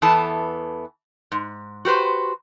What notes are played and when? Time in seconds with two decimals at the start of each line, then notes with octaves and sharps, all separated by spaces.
0.02 E2 E3 B3 A4 A5
1.32 G#2
1.85 F#4 G4 B4 C5